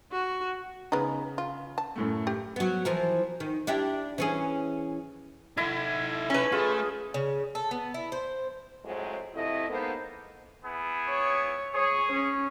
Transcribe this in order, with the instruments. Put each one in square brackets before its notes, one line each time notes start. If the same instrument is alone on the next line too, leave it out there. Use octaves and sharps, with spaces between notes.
[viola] F#4
[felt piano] C#3 [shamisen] G#3 B3 D#4
[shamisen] F4
A5
[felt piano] F#2 A2 A3
[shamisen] G4
[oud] F#3 B3
E3 F3 A#4
D#3
D4 E4 G4
E3 C#4 G#4
[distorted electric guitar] D#4 A4 [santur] E4
[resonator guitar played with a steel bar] C#4 B4
[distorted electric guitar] A3 [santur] F4 [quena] G#4
[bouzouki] C#3
A4
B3
E4
C5
[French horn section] F2 A2 F#3 G#3 C5
F2 C3 A3 E4 D#5
G#2 A#3 B3 A4 C5
[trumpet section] B3 E4 G#4
[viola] C#5
[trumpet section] G#4 [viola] C#5
[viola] C#4